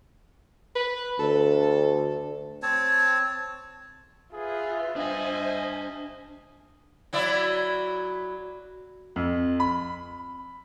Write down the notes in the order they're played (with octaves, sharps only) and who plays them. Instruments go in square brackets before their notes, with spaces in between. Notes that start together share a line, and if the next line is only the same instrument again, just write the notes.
[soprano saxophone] B4
[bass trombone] D2 [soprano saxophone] A4
[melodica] C4 C#5 A5
[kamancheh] F4 B4 [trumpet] G#4 [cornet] E5
[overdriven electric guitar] D4 G5 [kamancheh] C5 G#5 [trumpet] D#5
[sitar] F#3 E4 D5
[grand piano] F2
B5